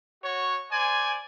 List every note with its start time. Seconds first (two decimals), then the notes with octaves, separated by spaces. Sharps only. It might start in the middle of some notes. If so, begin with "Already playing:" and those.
0.24 F#4 C#5
0.72 C5 D5 G#5